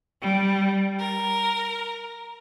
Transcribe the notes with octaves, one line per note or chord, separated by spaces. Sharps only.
G3
A#4